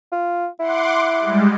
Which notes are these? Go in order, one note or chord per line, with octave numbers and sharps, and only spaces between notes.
F4
E4 F#5 C6 D6
G3 G#3